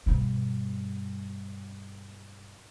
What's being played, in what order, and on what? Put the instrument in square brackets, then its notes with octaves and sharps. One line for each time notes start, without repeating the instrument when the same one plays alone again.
[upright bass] G2 B2